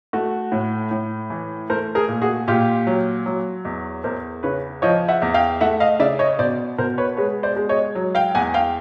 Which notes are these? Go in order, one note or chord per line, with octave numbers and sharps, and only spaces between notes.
A3 F#4
A2
A2
E3
A3 A#4 C5
G#4 A#4
A#2
F#4 G#4
A#2 F4 G4
F#3
F#3
E2
E2 A#4 C5
C#3 B4 C#5
F3 C#5 D#5
E5 F#5
E2
F5 G5
A3 E5 F#5
D#5 F5
C#3 D5 E5
C#5 D#5
B2 C5 D5
B2 A#4 C5
B4 C#5
G#3 B4 C#5
C5 D5
G#3
C#5 D#5
F#3
F5 G5
E2 F#5 G#5
F5 G5